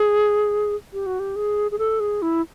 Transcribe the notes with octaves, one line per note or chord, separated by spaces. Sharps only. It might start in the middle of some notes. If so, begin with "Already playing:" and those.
Already playing: G#4
G4
F#4
G4
G#4
G#4
A4
G#4
E4